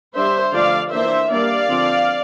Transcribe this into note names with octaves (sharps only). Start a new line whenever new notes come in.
G3 D4 C5 E5
D3 F3 A3 D4 D5 F5
E3 A#3 D4 C5 E5
G3 A#3 D4 D5 F5
D3 F3 C4